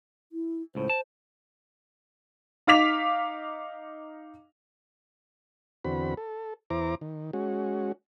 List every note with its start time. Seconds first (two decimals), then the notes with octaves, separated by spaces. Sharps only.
0.32 E4
0.75 C#2 A2 C5
0.90 A5
2.67 D#4 F5 D6 B6 F7
5.85 E2 D3 C4 F#4 B5
6.17 A4
6.70 E2 E4 C5 A#5 D6
7.01 D#3
7.33 G#3 C#4 F#4